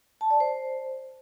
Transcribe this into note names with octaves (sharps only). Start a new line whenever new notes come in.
A5
D5
C5